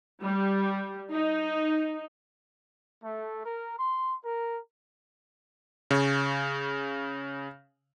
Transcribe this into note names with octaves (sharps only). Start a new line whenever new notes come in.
G3
D#4
A3
A#4
C6
A#4
C#3 C#5